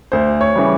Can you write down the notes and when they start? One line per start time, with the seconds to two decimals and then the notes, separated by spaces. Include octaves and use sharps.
0.12 D2 C5
0.41 C#5
0.56 C#3 E3 G3